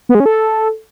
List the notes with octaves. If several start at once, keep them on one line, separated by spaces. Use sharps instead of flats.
B3
G#3
C#4
A4